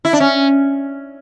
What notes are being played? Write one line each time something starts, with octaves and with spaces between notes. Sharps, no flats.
E4
D4
C#4